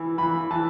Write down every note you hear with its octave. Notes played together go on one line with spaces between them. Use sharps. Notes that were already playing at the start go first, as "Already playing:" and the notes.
Already playing: E3
E3 B5
E3 A5